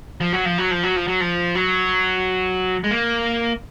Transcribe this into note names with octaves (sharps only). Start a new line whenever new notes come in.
F3
F#3
F3
F#3
F3
F#3
F3
F#3
F3
F#3
G#3
A#3